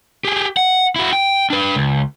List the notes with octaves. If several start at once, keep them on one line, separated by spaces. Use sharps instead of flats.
G4 G#4
F#5
E4 F#4
G5
D4 B4
C#2